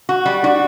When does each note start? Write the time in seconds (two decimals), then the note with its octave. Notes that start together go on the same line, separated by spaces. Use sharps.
0.09 F#4
0.26 G3
0.43 D4 F#4